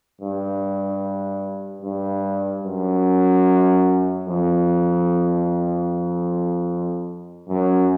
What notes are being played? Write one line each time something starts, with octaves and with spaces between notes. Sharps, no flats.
G2
G2
F#2
F2
F#2